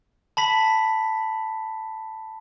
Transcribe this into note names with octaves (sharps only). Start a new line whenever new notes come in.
A5 B5 B6